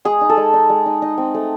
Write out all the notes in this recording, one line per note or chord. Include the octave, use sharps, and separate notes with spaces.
G#3 G#4
D#4
A4
G#3
D#4
G#3
D#4
D#4
C4
A3